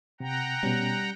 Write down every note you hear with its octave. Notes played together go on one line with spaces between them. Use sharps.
C3 F#5 G5 A#5
B2 G3 C#4